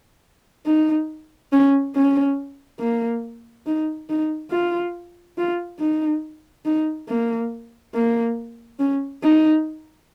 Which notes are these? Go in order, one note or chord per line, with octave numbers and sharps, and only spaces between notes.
D#4
C#4
C#4
A#3
D#4
D#4
F4
F4
D#4
D#4
A#3
A#3
C#4
D#4